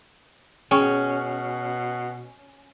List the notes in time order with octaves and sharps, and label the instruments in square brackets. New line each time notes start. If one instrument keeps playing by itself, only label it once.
[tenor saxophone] B2 [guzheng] C#4 [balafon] G#4 G5 C#6